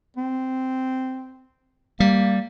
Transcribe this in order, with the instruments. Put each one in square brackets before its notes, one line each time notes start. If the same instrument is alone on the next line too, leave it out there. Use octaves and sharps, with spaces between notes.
[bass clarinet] C4
[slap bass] G3 [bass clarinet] A#3